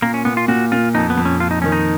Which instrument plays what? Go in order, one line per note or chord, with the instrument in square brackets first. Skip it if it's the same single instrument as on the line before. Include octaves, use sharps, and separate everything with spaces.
[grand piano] A#2 [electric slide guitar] A#3
[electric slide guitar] C#4
[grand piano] A#2 [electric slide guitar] B3
[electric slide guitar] F4
[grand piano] A#2 [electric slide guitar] F#4
[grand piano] A#2 [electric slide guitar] F4
[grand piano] F2 [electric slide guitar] D#4
[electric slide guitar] B3
[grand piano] F2
[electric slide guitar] C#4
[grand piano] F2 [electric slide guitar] F4
[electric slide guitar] D#4
[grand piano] D#3 [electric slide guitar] C#4
[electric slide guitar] D#4